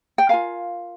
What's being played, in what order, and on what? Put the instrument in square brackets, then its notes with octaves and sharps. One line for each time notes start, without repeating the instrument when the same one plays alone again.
[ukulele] G5
F4 A#4 F5 G#5